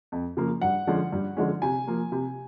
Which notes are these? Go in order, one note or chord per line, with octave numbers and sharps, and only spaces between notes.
F2
C#3 F3 A#3
G2 F#5
D3 F3 G#3 C#4
G2
D3 F3 G#3 C#4
C3 G#5
F3 A#3
C3